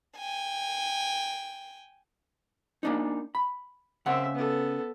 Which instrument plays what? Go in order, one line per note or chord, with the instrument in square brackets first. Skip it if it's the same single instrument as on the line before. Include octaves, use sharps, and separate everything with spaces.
[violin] G5 G#5
[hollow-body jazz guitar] A#3 D4 D#4
B5
[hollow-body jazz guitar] C#3 F#5 [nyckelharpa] C4 E5
[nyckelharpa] B3 A4